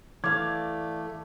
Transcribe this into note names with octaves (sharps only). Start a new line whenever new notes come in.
E3 A3 D5 F5 D6 G#6